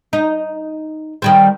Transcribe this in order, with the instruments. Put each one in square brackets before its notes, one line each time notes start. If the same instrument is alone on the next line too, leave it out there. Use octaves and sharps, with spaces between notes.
[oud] D#4
D#3 G3 C4